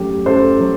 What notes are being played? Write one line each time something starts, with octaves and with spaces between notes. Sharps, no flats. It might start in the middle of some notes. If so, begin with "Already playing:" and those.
Already playing: F#2 F#3 A3 G4
F#2 A4 C5
F#3